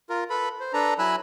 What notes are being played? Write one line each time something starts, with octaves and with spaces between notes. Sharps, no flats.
F4 A#4
A4 B4 B5
C5
D4 A4 B4 A#5
F#3 E4 G#5 B5 E6 F#6